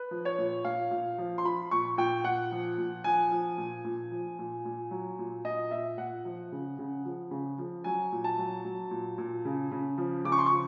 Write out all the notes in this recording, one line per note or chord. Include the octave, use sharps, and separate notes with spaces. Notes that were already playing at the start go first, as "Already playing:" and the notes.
Already playing: B4
F3
C#5
A#2
A#2 F5
A#2
F3
C6
F3 B5
A#2 C#6
A#2 G5
A#2 F#5
F3
A#2
F3 G#5
F3
A#2
A#2
F3
A#2
A#2
F#3
A#2
A#2 D#5
A#2 E5
A#2 F#5
F3
C#3
C#3
F3
C#3
F3
F#3 G#5
A#2
A5
F#3
F#3
A#2
A#2
C#3
C#3
F3
C#3 D6
C#6
C6
C#6
F3